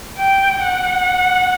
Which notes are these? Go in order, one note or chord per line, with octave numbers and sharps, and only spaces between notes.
G5
F#5